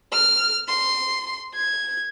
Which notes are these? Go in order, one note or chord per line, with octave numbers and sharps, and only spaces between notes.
F6
C6
G#6